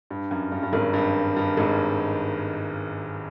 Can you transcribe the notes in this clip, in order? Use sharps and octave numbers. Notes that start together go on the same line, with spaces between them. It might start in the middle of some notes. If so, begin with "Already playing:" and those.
G2
F#2
G2
G2
G#1 G#2
G2
G2
G#1 G#2